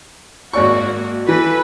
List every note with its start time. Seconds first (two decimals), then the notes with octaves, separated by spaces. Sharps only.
0.53 G#1 A#3 F#4 D5 C#6
1.28 E3 A4 B4